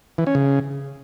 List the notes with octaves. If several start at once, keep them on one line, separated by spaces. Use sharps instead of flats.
E3
C#4
C#3